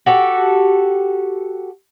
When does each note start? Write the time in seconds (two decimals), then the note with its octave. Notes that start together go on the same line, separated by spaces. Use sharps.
0.06 F#4 G4 A4